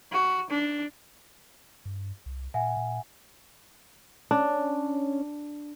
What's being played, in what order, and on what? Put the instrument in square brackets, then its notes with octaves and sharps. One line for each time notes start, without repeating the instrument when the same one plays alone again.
[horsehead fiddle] F#4
D4
[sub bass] G2
C2
[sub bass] A#2 [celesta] E5 F#5 G#5
[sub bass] A#2
[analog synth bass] C#4 [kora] D4